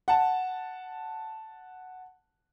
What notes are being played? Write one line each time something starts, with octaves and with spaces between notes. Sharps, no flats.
F#5 A5